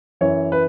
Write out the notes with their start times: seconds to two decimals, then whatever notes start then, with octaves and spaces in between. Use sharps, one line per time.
0.21 F#2 E3 C#5
0.52 B4